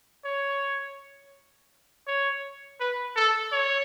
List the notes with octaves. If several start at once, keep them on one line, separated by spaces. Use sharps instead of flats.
C#5
C#5
B4
A4
C#5